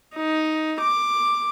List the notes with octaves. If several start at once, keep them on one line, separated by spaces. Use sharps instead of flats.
D#4
D6